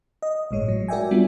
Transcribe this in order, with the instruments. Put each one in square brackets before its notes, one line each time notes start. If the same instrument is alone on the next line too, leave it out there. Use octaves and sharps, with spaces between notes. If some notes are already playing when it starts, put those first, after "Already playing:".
[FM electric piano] D#5
G1 A2 G#3 C#5
F#3
F#4 A#4 D5 E5 G5 G#5
G3 B3 D4 F4